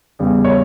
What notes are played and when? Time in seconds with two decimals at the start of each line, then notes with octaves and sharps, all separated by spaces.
0.19 E2 C#3 G3
0.45 C#5